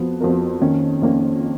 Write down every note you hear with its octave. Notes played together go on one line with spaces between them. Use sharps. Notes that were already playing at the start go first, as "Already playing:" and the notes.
Already playing: F2 F3 B3 F#4
F2 F3 B3 F#4 A#4
F2 D#3 A#3 C#4
F2 D#3 A#3 C#4